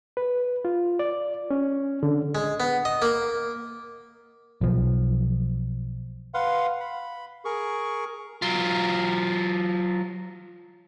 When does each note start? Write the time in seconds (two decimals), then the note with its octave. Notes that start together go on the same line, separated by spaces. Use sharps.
0.17 B4
0.65 F4
0.99 D5
1.51 C#4
2.03 D3
2.35 G#3
2.60 B3
2.85 D#5
3.02 A#3
4.61 B1 F3
6.34 B4 F5 F#5 C6
6.80 B5
7.45 G#4 A#4 C#6
8.42 F#3 F4